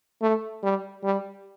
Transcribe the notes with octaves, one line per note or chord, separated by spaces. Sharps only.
A3
G3
G3